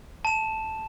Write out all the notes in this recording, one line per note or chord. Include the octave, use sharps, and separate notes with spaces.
A5 E7